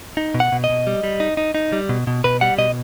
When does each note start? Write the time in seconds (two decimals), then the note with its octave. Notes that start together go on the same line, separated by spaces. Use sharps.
0.17 D#4
0.34 B2
0.40 F#5
0.52 B2
0.64 D#5
0.70 B2
0.87 G3
1.03 G3
1.20 D#4
1.37 D#4
1.55 D#4
1.72 G3
1.89 B2
2.07 B2
2.24 B2 B4
2.41 G3 F#5
2.58 B2 D#5